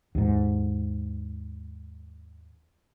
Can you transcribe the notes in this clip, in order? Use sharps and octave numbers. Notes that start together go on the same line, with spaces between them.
D#2 G#2